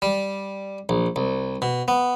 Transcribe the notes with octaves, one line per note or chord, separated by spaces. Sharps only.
G3
A#1
C2
B2
B3